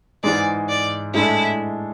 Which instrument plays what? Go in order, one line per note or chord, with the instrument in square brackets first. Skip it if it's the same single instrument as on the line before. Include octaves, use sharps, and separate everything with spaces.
[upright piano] G#2 E3 G#3 [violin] D5
[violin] D5
[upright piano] A2 G#3 D4 A4 [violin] E4